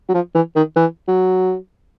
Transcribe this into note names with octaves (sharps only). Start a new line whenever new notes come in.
F#3
F3
E3
D#3
E3
F#3